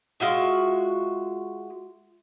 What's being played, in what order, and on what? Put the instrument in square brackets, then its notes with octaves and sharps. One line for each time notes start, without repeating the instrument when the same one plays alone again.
[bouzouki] G#3 F4 F#4 E5